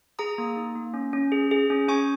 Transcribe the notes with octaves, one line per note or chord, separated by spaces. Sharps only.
G#4 A#5 D#6
A#3
D#4
A#3
C#4
C#4
G#4
G#4
C#4
C#4 G#5 C#6